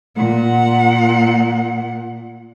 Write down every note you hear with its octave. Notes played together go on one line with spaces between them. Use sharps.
A#2 F#5